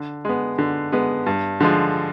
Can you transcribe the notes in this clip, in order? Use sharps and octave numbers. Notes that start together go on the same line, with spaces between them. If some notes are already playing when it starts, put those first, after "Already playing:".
Already playing: D3
G#3 B3
D3
G#3 B3
G2
D3 F3 G#3